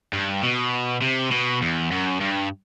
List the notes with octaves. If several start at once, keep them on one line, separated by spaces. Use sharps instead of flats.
G2
B2
C3
B2
E2
F#2
G2